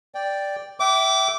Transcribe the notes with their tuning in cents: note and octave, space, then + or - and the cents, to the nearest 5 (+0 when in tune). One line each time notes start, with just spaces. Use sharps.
D5 -5 G5 +0
E5 +0 G5 -35 D6 -15